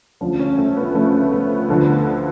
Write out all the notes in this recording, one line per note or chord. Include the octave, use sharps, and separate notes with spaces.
D2 C#3 F3
C#4
A3
B3
D2 C#3 F3 A3
B3
D2 D3 F3